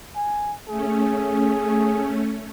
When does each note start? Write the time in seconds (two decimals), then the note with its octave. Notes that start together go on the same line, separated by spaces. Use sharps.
0.16 G#5
0.68 A3 C#4 G#4